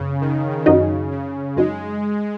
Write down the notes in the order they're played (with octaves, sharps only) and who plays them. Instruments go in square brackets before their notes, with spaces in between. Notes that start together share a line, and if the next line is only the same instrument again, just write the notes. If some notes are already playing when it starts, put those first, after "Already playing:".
Already playing: [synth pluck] F#2 B3 [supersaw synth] C#3
[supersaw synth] D#3
[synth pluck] F#2 F#3 D#4 F#4 D#5 [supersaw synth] C#3
[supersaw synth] C#3
[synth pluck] F#2 F#3 D#4 [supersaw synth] G#3